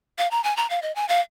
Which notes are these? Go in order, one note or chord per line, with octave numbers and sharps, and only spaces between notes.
F5
A#5
G#5
A#5
F5
D#5
G#5
F5